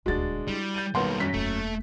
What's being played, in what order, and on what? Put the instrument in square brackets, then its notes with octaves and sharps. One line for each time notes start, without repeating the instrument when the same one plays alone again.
[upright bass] D#1 D2 [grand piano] G#3 D4 [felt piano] F#4 A6
[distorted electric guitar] G3 [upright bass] E4
[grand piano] G6 A6 D#7
[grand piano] B1 D#3 [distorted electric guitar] G3 A#3 [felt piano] B4 F#5 C6
[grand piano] F#2 [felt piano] B6
[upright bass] E1 A#3 [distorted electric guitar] A3